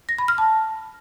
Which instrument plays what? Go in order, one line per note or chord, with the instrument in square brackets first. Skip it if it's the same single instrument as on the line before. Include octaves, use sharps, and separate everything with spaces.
[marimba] A#6
B5
F6
A5